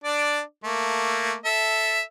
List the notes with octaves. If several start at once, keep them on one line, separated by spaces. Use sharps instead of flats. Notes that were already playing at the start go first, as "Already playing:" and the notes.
D4 D5
A3 A#3
A4 E5